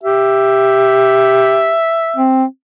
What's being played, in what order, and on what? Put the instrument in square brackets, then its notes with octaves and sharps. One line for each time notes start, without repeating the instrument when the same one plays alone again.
[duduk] G4 [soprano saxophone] E5
[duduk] C4